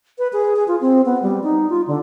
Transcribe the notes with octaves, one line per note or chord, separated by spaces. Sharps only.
B4
G#4
G#4
F4
C4
B3
G3
D#4
F4
D3